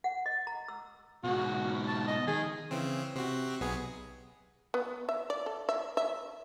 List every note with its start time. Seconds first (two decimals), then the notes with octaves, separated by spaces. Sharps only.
0.04 F#5
0.26 D#5
0.47 A#5
0.68 E6
1.24 G#2 B2 F#4
1.88 A5
2.08 D#5
2.27 D#3 G#4
2.71 C#3 E3 C4
3.15 C3 C4 F#4
3.61 B1 B3 G#4
4.74 B3
5.09 E5
5.30 D5
5.46 A4
5.69 E5
5.97 E5